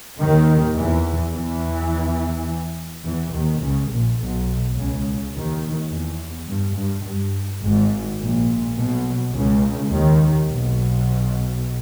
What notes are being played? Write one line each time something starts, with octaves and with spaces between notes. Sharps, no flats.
D#2 D#3
E2 E3
E2 E3
E2 E3
D#2 D#3
C#2 C#3
A#1 A#2
B1 B2
C#2 C#3
D#2 D#3
E2
G2
G2
G2
G#1 G#2
A#1 A#2
B1 B2
C#2 C#3
D#2 D#3
B1 B2